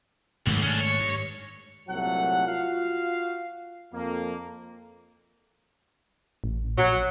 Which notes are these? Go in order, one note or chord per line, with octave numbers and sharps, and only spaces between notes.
B1 G#2 D#3 A3
C#4 D4
C#5
G2
C2 A#2 F#3 A3 F#5
F4 F#4 F5
F2 A#3
A1
A#1 F#3